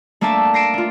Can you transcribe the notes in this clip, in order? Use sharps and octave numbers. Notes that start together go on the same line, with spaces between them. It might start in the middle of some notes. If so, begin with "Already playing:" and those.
A3 A#3 D4 D5 E5 A5
A#6 C7 D7 E7
D4 F4